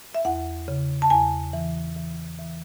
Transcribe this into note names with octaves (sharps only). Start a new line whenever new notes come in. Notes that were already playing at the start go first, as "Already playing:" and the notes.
E5
E2 F#5
C#3
A5
E2 G#5
E3
E3
E3